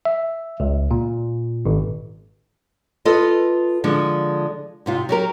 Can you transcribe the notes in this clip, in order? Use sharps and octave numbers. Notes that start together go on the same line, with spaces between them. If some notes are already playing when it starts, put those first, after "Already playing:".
E5
C#2
A#2
G#1
F4 A4 B4 D#5
D3 F3 G#3 D4
G#2 C3 F4
F#3 G4 A#4